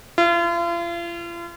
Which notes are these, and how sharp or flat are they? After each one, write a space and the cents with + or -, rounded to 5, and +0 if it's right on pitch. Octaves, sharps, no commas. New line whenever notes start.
F4 -40